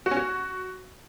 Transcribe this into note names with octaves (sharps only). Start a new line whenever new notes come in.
F#4
C#4
F#4